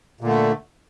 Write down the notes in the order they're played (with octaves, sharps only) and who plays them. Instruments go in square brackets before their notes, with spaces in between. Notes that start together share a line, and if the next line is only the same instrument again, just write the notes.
[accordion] A#2
D3
A3